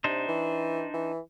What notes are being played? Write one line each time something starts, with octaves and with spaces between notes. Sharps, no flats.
C3 D4 D#4 C5
E3
E3